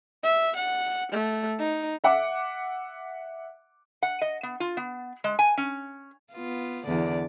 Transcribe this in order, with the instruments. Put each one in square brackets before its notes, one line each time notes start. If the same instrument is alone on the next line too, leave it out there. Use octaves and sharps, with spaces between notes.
[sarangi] E5
F#5
A3
D#4
[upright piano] E5 F#5 D6
[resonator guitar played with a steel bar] F#5
D#5
B3
F4
B3
G#3
G#5
C#4
[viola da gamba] B3 F4
E2 D3 D5